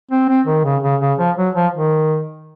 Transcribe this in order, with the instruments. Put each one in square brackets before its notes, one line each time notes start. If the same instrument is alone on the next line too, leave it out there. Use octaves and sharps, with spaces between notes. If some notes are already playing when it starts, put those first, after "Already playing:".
[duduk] C4
C4
D#3
C#3
C#3
C#3
F3
F#3
F3
D#3